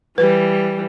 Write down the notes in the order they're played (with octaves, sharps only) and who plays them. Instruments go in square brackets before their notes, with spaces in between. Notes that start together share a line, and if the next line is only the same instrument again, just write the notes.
[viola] E3 G3 [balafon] B4